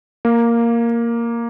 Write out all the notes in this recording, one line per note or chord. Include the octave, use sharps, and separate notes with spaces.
A#3